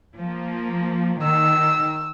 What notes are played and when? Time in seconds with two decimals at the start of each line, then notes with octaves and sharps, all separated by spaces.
0.18 F3 A#3
1.23 D#3 E6